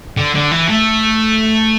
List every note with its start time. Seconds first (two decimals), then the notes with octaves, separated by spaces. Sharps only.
0.17 D3
0.35 D3
0.51 E3
0.69 A3